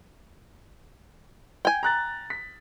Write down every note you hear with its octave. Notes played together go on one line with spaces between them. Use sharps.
G5 G#5
A#5 F#6 A6
B6